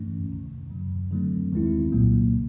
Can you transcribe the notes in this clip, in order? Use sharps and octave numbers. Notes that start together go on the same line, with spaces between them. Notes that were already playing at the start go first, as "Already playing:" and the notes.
Already playing: G2 E3 A3 C#4
C#2 C3 D#3
F#2 C#3 F#3
D3 F#3 A3 C4
D#2 D#3 G#3 C4 E4
C2 A#2 F#3 A#3
C#3